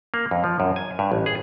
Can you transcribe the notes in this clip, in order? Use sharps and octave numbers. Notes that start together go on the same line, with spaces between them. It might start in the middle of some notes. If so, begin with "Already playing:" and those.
A#3
F2
F3
F#2
G#5
G2
A1
G#4